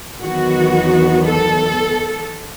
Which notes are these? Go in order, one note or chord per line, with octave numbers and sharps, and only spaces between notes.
E2 D#3 F#3 B3 F#4
A4